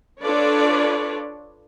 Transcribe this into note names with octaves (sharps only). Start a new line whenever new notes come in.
D4 F4 A4 B4 C#5 D5